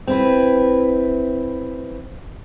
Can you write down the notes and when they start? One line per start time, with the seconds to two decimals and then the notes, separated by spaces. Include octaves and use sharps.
0.07 C4 E4 B4